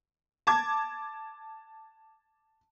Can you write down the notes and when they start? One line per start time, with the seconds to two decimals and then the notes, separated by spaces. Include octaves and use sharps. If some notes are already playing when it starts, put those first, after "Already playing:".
0.47 A5 D6 G#6